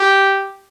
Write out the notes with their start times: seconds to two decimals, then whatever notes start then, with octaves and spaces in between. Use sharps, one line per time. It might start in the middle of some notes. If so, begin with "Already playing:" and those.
Already playing: G4